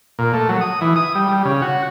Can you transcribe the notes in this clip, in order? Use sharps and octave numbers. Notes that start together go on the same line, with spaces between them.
A#2
A3
F#3
D#6
E3
D#6
G3
G3
C#3
F#4